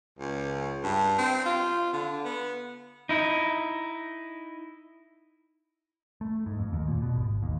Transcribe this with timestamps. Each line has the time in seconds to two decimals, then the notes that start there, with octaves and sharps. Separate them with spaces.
0.19 C#2
0.84 G2
1.18 C4
1.45 F4
1.93 D3
2.25 B3
3.09 D#4 E4
6.21 A3
6.46 G#2
6.59 F2
6.73 D#2
6.88 A#2
7.02 B2
7.16 G#1
7.43 D#2